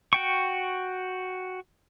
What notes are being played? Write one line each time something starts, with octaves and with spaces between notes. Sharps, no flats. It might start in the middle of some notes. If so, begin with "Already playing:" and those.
F#4 G5 C#6